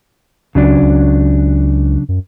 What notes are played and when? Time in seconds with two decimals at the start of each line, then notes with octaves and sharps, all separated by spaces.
0.55 C#2 C#3 F#3 D4
0.82 C#2
2.09 F#2